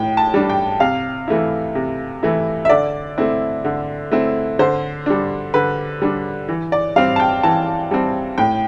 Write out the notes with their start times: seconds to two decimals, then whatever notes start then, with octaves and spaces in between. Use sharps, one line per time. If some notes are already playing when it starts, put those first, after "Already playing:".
Already playing: A2 G5
0.17 A5
0.34 G3 D4
0.50 G5
0.80 C3 F5
1.28 E3 A3 E4
1.75 C3
2.23 E3 A3 E4
2.65 E5
2.70 D3 D5
3.18 A3 C4 E4
3.64 D3
4.12 A3 C4 E4
4.59 D3 C5
5.06 G3 D4
5.54 D3 B4
6.02 G3 D4
6.48 E3
6.72 D5
6.96 G3 C4 F5
7.16 A5
7.20 G5
7.43 E3 A5
7.91 G3 C4
8.38 A2 G5